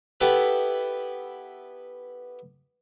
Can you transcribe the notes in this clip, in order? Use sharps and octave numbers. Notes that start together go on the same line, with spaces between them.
B3 E4 G4 A4 B4